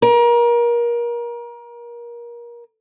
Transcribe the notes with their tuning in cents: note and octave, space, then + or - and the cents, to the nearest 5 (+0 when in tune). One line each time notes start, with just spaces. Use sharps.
A#4 +30